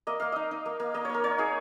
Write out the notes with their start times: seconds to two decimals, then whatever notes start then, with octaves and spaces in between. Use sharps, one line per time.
0.07 A#3 D#5
0.20 A#3 F5
0.32 D#4 D#5
0.51 D#4
0.66 A#3
0.80 A#3
0.94 A#3 D#5
1.05 A#3 C#5
1.14 A#4
1.24 D#4 C#5
1.38 D#4 G#4